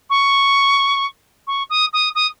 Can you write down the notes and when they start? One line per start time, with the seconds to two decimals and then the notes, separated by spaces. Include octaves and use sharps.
0.10 C#6
1.47 C#6
1.70 D#6
1.93 D#6
2.15 D#6